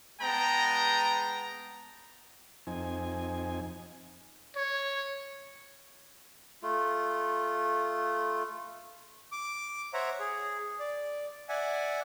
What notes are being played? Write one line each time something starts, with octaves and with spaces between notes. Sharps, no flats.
G#3 B3 G5 A5 A#5
F2 C4 D#4 G#5
C#5
A3 F4
D6
C5 C#5 E5 F#5 A#5
G#4
D5
D5 E5 F#5 G#5